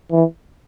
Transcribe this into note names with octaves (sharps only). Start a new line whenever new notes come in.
E3